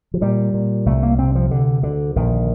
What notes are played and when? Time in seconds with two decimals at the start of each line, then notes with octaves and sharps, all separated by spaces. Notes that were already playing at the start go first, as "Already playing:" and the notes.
0.14 F3
0.21 A#2 G3
0.54 A#2
0.86 C2 A3
1.03 A#3
1.18 C3 C4
1.35 F3
1.51 D2 D3
1.83 D2 D3
2.16 A#1 D#3